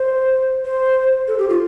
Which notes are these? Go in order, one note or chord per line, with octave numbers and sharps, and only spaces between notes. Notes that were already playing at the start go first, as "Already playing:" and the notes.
Already playing: C5
C5
A4
G4
F4